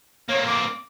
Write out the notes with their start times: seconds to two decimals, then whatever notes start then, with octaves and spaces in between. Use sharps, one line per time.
0.29 A#3 C4 C#5
0.46 D6